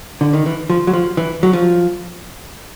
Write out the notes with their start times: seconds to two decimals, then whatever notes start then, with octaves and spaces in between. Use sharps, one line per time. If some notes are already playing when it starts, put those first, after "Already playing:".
0.21 D3
0.33 D#3
0.46 E3
0.70 F3
0.87 F#3
0.93 F3
1.17 E3
1.43 F#3
1.53 F3